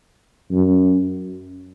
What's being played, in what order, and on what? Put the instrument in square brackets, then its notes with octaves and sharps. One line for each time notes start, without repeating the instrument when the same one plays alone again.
[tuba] F#2